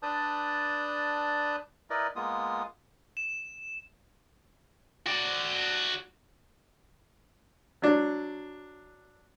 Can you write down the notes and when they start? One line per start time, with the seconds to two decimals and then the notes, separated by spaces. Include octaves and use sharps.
0.03 D4 B4 D5 A5 D#6 G6
1.90 E4 A#4 B4 D5 D#5
2.16 G#3 A#3 B3 F4 D#6
3.17 E7
5.06 F#4 D5
7.82 F#3 D4